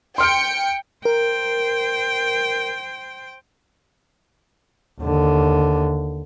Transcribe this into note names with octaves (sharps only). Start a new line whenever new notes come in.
G5 C6 F6 C#7 D7
A#4 C5 G5
D#2 D3